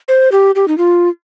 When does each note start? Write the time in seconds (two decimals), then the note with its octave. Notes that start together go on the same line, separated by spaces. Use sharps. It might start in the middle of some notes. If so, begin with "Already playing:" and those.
0.08 C5
0.32 G4
0.55 G4
0.68 D#4
0.78 F4